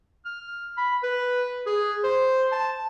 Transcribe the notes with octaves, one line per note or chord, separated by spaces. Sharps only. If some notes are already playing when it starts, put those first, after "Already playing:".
F6
B5
B4
G#4
C5
A5